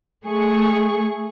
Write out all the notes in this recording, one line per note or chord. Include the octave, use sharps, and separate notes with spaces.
A3 G#4 C#6